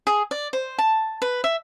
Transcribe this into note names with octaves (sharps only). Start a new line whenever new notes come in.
G#4
D5
C5
A5
B4
E5